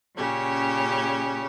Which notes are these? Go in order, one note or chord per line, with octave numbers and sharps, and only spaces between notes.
A#2 C#3 C#4 G4